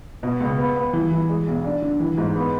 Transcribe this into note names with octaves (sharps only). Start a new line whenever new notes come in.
B2
C#2
B3
B3
E3
E3
G#3
B1
D4
D3
E3
G#2
B3